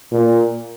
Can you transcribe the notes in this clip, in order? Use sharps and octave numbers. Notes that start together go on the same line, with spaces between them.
A#2